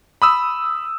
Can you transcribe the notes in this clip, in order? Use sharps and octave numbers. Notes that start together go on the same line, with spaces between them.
B5 D#6 E6